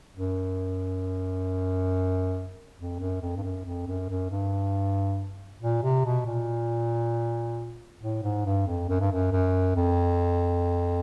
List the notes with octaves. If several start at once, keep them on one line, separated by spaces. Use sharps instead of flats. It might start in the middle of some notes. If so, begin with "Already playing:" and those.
F#2
F2
F#2
F2
G2
F#2
F2
F#2
F#2
G2
A#2
C3
B2
A#2
A2
G#2
G2
F2
F#2
G2
F#2
F#2
F2